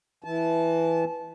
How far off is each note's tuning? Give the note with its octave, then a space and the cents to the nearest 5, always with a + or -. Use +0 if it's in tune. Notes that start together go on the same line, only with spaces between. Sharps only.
E3 +0 A5 -25